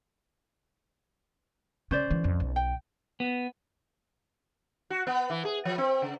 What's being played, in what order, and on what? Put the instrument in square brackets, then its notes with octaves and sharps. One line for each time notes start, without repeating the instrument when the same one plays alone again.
[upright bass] C#3 [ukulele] C#4 C5 D5
[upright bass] D3 E3
C2 F2
B1
[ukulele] G5
[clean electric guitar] B3
[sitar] F#4
B3
E3
G#4
F3
C4
C#3